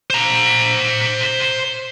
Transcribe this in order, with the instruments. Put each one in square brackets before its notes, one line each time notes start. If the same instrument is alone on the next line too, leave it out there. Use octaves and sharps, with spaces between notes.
[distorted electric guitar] C5 A#5